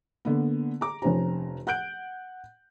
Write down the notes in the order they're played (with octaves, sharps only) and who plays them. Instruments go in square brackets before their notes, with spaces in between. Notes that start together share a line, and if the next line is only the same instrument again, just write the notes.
[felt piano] D3 A#3 B3
A#5 D6
F1 F2 C#4 C5 A#5
F#5 F#6 G6 D7